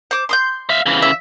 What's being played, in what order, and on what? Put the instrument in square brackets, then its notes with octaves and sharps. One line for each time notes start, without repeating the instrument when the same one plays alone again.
[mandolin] C5 D6
C6 D#6 G6
[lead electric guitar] E5 F5
C#3 E3
[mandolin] E5